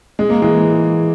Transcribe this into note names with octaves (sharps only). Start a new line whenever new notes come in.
G#3
A#3
E3 G#3